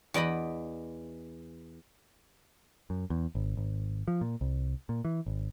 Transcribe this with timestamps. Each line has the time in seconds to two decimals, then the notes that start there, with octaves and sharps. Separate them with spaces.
0.14 E2 D5 D#5 B5
2.90 F#2
3.10 E2
3.35 G#1
3.57 G#1
4.08 F3
4.21 A#2
4.41 C2
4.89 A#2
5.05 E3
5.26 G#1